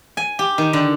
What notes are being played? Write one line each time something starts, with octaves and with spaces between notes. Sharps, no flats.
G#5
G4
D#3
D3